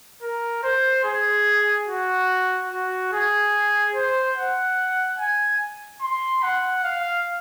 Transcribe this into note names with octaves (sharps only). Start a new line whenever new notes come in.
A#4
C5
G#4
F#4
F#4
G#4
C5
F#5
G#5
C6
F#5
F5